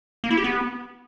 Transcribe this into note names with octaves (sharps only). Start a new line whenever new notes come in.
A#3
E4
G4
B3